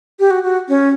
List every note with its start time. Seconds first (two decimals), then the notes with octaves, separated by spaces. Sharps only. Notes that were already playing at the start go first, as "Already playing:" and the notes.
0.20 G4
0.31 F#4
0.44 F#4
0.69 C#4